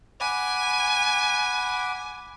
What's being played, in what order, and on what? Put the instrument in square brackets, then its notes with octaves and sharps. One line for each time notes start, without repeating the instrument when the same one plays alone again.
[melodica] F#5 B5 D6 [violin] G#5